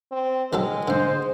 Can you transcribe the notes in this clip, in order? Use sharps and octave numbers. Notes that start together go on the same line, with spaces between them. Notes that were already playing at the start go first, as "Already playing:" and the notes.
C4
D#3 F#3 G#3 A4
G#2 D3 C5